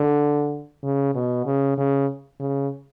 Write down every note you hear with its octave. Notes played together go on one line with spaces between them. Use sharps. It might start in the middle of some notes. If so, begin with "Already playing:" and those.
Already playing: D3
C#3
B2
C#3
C#3
C#3